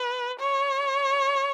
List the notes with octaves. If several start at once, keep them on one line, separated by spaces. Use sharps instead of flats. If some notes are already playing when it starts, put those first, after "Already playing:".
Already playing: B4
C#5